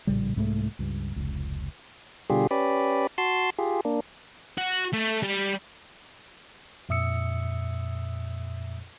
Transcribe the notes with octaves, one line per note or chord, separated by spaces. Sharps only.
A#1 A2 C#3 G3
C2 G#2 G#3 A3
C#2 G2
F1 C#2
B2 D3 G3 F4 G4 G#4
C#4 G4 B4 D5
F#4 A5 C6
F4 G4 G#4
A#3 D4
F#4
A3
G3
F2 A#2 E5 D#6 E6 C#7